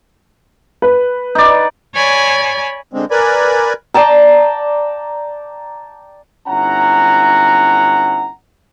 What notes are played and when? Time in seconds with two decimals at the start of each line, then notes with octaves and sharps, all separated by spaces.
0.82 B4
1.35 D#4 D5
1.95 C#5 D5 G#5 B5
2.93 D3 G#3 C4
3.11 A#4 B4 D5 G#5 B5
3.94 D5 G5 A5 A#5
6.47 G1 C#4 E4 F#5 A#5